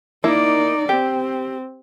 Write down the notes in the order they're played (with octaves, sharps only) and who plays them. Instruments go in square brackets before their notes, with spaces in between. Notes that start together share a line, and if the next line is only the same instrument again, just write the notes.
[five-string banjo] A#3 E4 [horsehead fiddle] D#4 D5
[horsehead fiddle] C4 [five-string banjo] G4